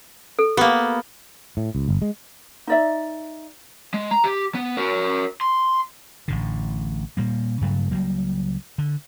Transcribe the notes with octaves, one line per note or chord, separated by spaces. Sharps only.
A4
A#3 B3 G4
A2
C#2
G1
G#3
D#4 D5 E5
G#3
A#5
G4
B3
F#4 A#4
C6
A1 A2 D3
A#2 G3 A#3
G2 C#3 F#3 A3
C#2 F#3 G3 A#3
D3